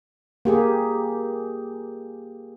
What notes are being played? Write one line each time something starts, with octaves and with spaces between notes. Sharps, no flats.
A#3 G4 G#4